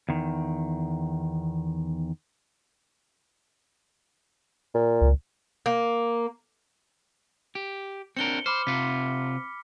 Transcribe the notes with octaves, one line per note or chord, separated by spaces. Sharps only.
E2 D#3
A#2
C#2
A#3
G4
C4 D4 A#4 C#7 G7
C5 B5 D6 F6
C3 F4 B6 C#7